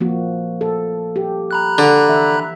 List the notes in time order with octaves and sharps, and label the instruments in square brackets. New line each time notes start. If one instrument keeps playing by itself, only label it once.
[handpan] F3 A#3 F#4
A4
G4
[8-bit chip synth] A#5 B5 F#6
[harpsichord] D3
[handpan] E3 E5